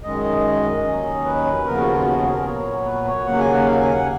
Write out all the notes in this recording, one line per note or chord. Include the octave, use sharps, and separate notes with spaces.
F#2 D#3 G#3 D#5
D#5
D#2 D#3 F#3 C#4
B4
D#2 C#3 F3 B3 A#4
F#4
F4
F#4
G#4
A#4
A#2 F#3 B3 C#5
B4
C#5
D#2 C#3 F#3 A#3 F#5
G#5
F#5
F5
G#5
F#5